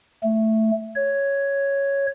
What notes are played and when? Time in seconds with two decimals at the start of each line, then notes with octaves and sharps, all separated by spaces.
0.23 A3
0.96 C#5